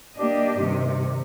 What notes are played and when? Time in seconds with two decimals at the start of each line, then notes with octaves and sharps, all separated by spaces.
0.16 A#3 D4 G4 D#5
0.60 G2 C3 D#3